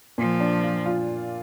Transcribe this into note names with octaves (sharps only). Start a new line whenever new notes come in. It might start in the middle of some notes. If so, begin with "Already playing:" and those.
A#2 F3
D4
F4
F4